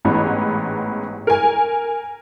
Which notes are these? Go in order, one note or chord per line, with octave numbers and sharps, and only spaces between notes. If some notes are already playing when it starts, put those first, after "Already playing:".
A1 G#2 B3
A#4 G#5